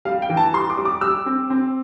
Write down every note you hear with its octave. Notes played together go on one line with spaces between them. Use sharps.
G3 F5
G5
E3
A5
G3 C6
D6
G3
D6
G3 E6
C4
C4